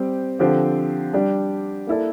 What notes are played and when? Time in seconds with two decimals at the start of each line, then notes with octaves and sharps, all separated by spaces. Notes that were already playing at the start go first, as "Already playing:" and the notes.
Already playing: G3 C4 G4
0.39 D3 F3 C4 G4 C5
1.13 G3 D4 G4 D5
1.87 A#3 E4 A4 D5